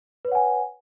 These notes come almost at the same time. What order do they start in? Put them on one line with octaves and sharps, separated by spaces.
B4 C#5 F#5 G#5